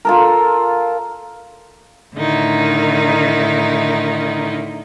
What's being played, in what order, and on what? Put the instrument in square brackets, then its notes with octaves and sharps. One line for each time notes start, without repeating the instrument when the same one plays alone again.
[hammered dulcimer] F4 A4 A#4
[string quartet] A2 D3 D#3 D#4 E4